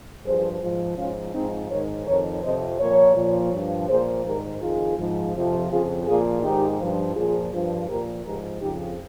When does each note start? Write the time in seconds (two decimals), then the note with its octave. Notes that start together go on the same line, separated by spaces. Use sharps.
0.25 G2 F3 G#4 C5
0.62 G#2 F3
0.98 G#2 F3 C#4 F4
1.34 G#2 F3 C4 D#4
1.70 G#2 D#3 A#4 C#5
2.06 F2 D#3 A#4 C#5
2.43 F2 C3 F3 C5 D#5
2.79 A#2 F3 A#4 C#5
3.16 A#2 F3
3.53 G2 F3
3.89 A#2 F3 G#4 C5
4.25 G#2 D#3 G4 A#4
4.61 F2 D#3 F4 G#4
4.98 G#2 F3
5.34 F2 C3 F3
5.71 F2 C#3 F3 F4 G#4
6.07 A#2 F3 F4 G#4
6.43 G#2 D#3 D#4 G4
6.80 G2 F3
7.16 A#2 F3 F4 G#4
7.53 G2 F3
7.88 A#2 F3 G4 A#4
8.25 G#2 F3 G4 A#4
8.61 F2 C#3 F3 D#4 G4